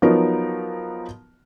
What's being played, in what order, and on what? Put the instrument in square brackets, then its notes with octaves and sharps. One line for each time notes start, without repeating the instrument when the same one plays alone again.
[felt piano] F3 F#3 B3 D#4 F#4 A#4